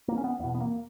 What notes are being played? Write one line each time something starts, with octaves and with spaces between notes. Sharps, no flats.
A#3
C#4
B3
E2 B2 B3
B3
A#3